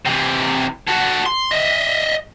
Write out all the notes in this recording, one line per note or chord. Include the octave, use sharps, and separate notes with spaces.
C3 E3
F#4 A4
C6
D#5 E5